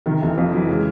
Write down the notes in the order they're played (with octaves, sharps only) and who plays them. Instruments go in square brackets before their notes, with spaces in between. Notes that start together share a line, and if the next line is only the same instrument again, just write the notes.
[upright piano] C3 [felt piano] D#3
[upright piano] F1 [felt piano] E3
[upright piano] F2 [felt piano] F3
[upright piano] E3 [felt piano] F#3
[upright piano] C#3 [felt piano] G#3